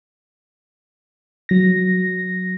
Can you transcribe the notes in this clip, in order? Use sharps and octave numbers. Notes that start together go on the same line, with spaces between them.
F#3 A#6